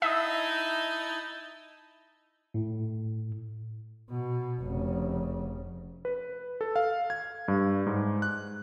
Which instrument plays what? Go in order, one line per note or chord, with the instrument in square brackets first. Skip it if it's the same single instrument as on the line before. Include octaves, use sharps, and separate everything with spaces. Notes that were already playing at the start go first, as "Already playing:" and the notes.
[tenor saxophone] D#4 [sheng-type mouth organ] E4 A5 [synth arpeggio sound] D#5 E5
[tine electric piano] A2
[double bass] B2
F1 C#3
[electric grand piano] B4
A4
F5
G#6
G2
G#2
F#6